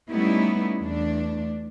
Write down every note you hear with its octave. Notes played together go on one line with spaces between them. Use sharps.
G3 A3 B3 C#4 D#4 E4
E2 A3 D4